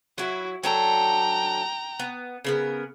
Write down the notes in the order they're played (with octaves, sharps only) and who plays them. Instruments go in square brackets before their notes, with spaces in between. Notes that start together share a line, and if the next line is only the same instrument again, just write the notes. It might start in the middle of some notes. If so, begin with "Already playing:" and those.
[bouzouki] F#3 E4 [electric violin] F#4
[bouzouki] F#3 D4 A4 [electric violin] G5 A#5
[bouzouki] B3
C#3 B3 A#4